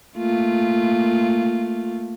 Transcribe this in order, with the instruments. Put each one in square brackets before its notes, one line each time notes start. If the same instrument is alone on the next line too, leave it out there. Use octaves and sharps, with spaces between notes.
[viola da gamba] A3 A#3 F4